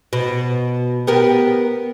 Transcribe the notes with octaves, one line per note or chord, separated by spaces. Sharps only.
B2
B3 G4 A#4